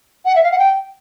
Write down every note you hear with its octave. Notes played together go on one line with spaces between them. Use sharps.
F#5
E5
F5
F#5
G5